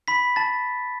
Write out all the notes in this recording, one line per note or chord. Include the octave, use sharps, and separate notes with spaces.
B5 B6
A5 A6